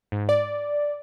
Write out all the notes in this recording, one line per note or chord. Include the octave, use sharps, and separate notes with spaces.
G#2
D5